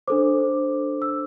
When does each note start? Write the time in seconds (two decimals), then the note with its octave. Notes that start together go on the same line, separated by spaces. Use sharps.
0.08 D4 A4 C5 D6
1.02 E6